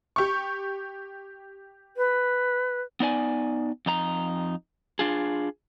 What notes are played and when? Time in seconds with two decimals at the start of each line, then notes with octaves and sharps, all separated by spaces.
0.16 G4 C#6
1.97 B4
3.00 B3 D#4 D5 G#5
3.86 F2 D#4 A#5
4.99 D4 F4 G#4